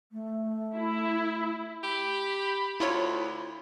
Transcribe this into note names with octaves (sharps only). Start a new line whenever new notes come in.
A3
E4
G4 B5
D2 E4 F4 C#5